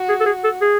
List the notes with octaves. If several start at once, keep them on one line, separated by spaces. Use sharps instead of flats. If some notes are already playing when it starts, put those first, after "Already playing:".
Already playing: F#4
G#4
A4
G#4
A4
G#4